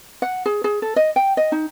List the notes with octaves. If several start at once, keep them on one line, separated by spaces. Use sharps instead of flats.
F#5
G#4
G#4
A4
D#5
G5
D#5
D#4